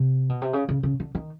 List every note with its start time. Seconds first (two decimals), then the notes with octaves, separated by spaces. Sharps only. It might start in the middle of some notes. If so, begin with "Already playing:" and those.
Already playing: C3
0.29 B2
0.42 C3
0.53 C#3
0.69 C#3
0.83 C#3
1.00 D3
1.15 D#3